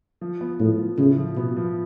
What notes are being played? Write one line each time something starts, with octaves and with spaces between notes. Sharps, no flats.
F3
B3
A2 F3
F3
A2 C#3
F3
B2 B3
F3